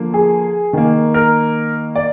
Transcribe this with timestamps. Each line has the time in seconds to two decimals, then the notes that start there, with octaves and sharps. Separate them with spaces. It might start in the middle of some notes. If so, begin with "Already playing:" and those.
Already playing: D3 F3 A#3
0.14 G#4
0.73 D#3 A#3
1.14 A#4
1.95 D5